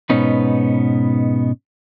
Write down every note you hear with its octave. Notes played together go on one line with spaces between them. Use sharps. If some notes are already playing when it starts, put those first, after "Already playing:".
G#2 B2 B3 C#4 D#4 B4